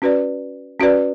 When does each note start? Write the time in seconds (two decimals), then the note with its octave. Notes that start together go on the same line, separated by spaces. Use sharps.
0.02 C#4 F#4 B4 D5
0.80 C#4 F#4 B4 D5